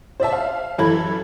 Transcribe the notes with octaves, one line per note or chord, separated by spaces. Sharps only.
C5 D5 E5 A5
F5
F#2 E3 A4 B5 G#6